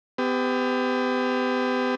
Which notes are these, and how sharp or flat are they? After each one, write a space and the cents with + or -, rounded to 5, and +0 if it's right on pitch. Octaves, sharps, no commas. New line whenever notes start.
B3 +40 G4 +20